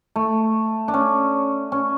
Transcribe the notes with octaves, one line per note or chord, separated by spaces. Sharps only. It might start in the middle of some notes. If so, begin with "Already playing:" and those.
A3
D4
C#4
C#4